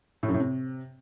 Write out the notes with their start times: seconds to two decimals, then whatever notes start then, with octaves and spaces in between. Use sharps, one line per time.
0.23 A2
0.28 F#2
0.34 A2
0.40 C3